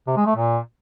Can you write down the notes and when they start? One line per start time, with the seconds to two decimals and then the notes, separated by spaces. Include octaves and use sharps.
0.07 C3
0.17 G#3
0.26 A3
0.36 A#2